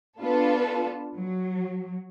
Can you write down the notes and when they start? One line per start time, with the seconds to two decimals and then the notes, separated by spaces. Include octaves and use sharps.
0.20 B3 D4 F4 A4 B4
1.16 F#3